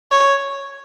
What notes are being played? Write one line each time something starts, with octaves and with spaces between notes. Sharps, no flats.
C#5